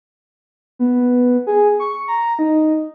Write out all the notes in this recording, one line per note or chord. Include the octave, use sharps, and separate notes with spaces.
B3
G#4
C#6
A#5
D#4